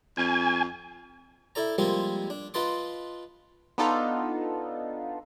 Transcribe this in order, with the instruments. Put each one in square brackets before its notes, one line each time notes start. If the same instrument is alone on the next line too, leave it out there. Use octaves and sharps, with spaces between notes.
[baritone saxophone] F2 [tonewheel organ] G#5
[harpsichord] E4 A4 D5 A#5
F3 G3 G#3 A#3 C4 F4
D4
F4 B4 D#5 A5 C6 D6
[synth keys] B3 D4 D#4 F4 A4